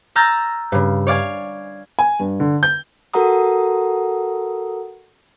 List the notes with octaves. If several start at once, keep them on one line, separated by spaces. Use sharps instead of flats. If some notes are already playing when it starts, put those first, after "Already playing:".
A#5 E6 F6 G6 A6 A#6
G2 C#3
C#5 D5 F5 G#5
G#5
G2
D3
G6
F#4 A4 A#4 F#5 A#5 D#6